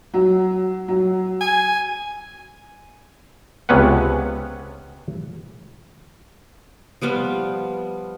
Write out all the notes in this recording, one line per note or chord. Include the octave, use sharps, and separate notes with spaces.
F#3
F#3
G#5
C#2 C3 B3 C#4 B4 F#5
F3 G3 B3 F4